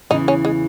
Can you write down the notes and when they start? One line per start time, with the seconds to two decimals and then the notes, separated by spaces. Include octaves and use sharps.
0.10 E2 C#3 E3 D#4
0.28 C#4
0.45 G#3